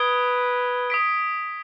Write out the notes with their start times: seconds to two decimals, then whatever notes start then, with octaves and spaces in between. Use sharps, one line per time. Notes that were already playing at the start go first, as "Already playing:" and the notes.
Already playing: B4 D#6 G#6 D7 G7
0.90 D#6 B6 D7